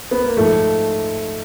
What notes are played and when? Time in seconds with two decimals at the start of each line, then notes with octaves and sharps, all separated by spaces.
0.11 B3
0.24 A#3
0.37 G#2 F3 A3